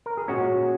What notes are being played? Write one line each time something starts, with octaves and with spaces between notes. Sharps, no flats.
A#4
G#4
A#2 G#3 C#4 F#4